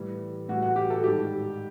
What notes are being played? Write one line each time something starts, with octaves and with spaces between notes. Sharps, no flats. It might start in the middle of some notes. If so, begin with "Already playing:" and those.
Already playing: A2 E3 G3
A2 E3 G3 F#4
F#4
G4
A4
G#2 D#3 G3 G4